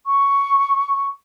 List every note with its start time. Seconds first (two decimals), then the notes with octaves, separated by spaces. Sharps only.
0.06 C#6